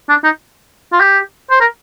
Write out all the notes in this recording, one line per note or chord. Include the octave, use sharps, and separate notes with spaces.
D4
D#4
F4
G4
C5
A#4